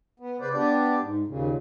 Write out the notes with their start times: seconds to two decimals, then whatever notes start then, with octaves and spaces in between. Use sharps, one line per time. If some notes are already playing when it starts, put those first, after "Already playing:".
0.20 B3
0.40 C#3 B4 C5 D5
0.54 B3 D4 G4 D5
1.02 G#2
1.27 D#2 A#2 C#3